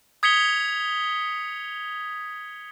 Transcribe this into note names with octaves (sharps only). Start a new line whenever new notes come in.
D#6 G#6 B6 C#7 F7 G7